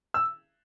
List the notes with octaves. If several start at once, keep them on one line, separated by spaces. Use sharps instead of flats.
E6